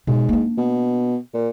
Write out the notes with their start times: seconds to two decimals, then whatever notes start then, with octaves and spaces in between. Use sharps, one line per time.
0.07 G#2 B2
0.29 A#3 D4
0.57 B2
1.34 A#2